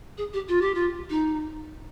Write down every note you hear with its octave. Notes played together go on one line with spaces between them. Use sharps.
G#4
G4
F4
G4
F4
D#4